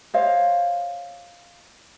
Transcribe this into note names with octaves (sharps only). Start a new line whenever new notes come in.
C5 C#5 D#5 F5